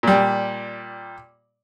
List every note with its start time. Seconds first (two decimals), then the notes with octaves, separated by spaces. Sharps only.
0.03 A#2 G3